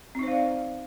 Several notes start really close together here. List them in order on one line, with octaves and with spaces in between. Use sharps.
C4 D#4 C5 F5 D5